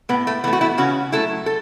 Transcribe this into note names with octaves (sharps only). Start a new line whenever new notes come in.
A2 B3
A3
E3 A3 B3
F#4
B3 E4
C#3 C#4 F#4
F#3 A3 E4 A4
A4